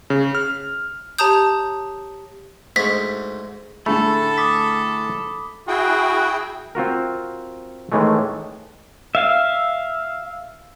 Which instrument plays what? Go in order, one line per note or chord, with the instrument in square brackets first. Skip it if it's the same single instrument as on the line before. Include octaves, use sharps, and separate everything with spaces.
[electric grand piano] C#3
F6
[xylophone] G4 C#5 A5 A#5 D#6 G6
[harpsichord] D2 G#2 D#5 [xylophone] B6
[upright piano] A2 D3 G#4 [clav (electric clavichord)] A3 [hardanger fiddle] A4 [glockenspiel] B5
[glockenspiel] D6 D#6 B6
[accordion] E4 G#4 G5 [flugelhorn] F#4
[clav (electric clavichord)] C4 F4 F#4 A#4
A2 D#3 E3 G#3 A3
[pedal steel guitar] E5 F5